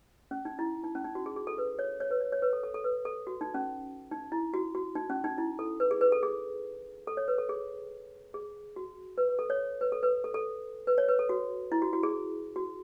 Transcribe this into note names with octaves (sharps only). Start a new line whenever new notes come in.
C#4
D#4
E4
D#4
C#4
D#4
F#4
G#4
G#4
A4
B4
C#5
C#5
B4
C#5
C#5
B4
A4
A4
A4
B4
A4
F#4
D#4
C#4
D#4
E4
F#4
F#4
D#4
C#4
D#4
E4
A4
B4
G#4
B4
A4
G#4
A4
C#5
B4
A4
G#4
G#4
F#4
B4
B4
A4
C#5
B4
A4
B4
A4
A4
B4
C#5
B4
A4
F#4
E4
F#4
F#4
G#4
F#4